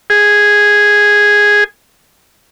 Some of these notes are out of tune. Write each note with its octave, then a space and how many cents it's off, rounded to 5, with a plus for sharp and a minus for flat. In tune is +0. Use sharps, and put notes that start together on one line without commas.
G#4 -5